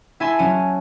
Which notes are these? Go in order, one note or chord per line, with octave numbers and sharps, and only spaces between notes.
E4 E5 G#5 A5 C6
F#3 C#4 D#7